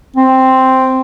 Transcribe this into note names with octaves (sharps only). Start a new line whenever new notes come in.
C4